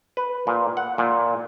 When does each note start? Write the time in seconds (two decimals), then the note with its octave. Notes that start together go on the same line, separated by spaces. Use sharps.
0.17 B4
0.47 A#2
0.77 F#5
0.98 A#2